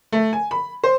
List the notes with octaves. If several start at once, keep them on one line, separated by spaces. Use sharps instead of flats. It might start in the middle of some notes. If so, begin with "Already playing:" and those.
A3
G#5
B5
C5